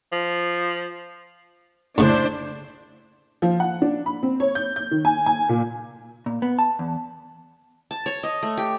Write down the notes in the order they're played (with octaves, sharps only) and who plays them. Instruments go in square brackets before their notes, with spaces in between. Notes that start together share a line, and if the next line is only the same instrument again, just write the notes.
[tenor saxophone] F3
[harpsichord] A2 C#3 [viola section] D4 E4 C5
[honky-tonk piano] F3
F#5
D4
B5
C4
C#5
G6
G6
D#3
G#5
G#5
A#2
[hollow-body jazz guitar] A#2
B3
A5
E2
[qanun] A5
C#5
D#5
A3
G4